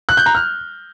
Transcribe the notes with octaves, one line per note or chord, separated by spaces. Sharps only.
F#6
G6
A#5
F6